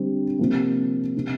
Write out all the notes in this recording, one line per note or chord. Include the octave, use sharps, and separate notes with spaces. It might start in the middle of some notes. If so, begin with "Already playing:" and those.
Already playing: D3 G3 C4
C3 F3 A#3
C3